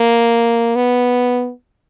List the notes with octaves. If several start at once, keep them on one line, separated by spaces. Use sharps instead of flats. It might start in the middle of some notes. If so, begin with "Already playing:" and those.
Already playing: A#3
B3